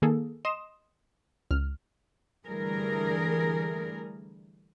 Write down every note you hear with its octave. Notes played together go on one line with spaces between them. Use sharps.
D#3 A#3 G#4 A4
D#5 C6 D#6 E7
C#2 F6
D3 E3 G3 A3 G#4 A#4